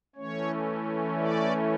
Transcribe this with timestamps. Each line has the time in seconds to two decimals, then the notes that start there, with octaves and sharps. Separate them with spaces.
0.16 E3 A3 C#4 C#5
1.18 D5